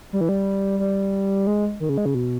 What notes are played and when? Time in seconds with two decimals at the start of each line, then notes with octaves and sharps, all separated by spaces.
0.13 G3
0.21 E3
0.29 G3
0.79 G3
1.47 G#3
1.80 D#3
1.89 C#3
1.98 G#3
2.06 C#3
2.15 B2